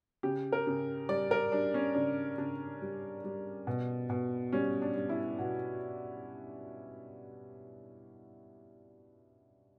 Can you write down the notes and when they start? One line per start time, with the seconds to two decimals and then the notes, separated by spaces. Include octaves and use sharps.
0.23 C#3 G4
0.52 A#4
0.67 C#3
1.09 G3 D5
1.31 A#4
1.52 G3 D4
1.74 C#4
1.95 C#3 D4
2.38 C#3 D4
2.82 G3
3.24 G3
3.67 B2
4.10 B2
4.52 G3 C#4
4.82 D4
4.96 G3
5.09 E4
5.39 B2 F#4